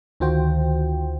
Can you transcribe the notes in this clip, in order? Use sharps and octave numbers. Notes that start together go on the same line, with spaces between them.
D2 D#3 F4 F#4 C5 G5